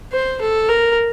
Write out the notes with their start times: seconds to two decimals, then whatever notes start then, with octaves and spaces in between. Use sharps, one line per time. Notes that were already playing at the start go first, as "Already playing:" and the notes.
0.12 C5
0.41 A4
0.69 A#4